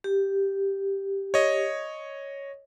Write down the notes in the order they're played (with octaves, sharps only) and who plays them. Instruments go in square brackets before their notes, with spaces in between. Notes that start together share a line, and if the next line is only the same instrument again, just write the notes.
[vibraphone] G4
[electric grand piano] C#5 D#5